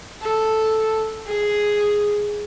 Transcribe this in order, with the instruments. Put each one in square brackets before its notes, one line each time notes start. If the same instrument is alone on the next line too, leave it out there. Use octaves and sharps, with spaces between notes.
[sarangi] A4
G#4